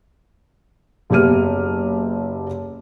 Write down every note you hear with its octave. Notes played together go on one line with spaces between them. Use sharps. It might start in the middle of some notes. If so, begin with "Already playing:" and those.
F#1 B3 G4 E5 F6 D#7